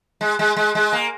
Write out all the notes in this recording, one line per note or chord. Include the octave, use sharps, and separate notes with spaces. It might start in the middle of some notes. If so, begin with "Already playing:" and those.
G#3
G#3
G#3
G#3
A#3